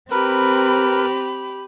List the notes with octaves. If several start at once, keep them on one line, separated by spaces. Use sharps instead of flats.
C4 G4 A#4 B4 B5